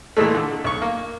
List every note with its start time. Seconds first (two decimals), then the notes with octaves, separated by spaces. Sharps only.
0.17 A#2 E3 G#3 A3
0.35 D3
0.64 B1 C#6
0.82 A#3